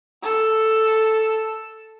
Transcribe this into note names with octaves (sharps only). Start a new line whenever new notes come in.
A4